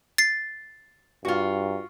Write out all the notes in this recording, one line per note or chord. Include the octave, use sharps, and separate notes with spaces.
A6 C7
G2 F4 F#4